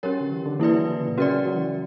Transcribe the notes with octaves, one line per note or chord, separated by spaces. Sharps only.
F#3 C#4 G4 A#4 C#5
D3
E3
D3
E3 A#3 E4 B4 D5
F#3
D3
C#3
A#2
C#3 C#4 F#4 A#4 D5
F#3
F#3
E3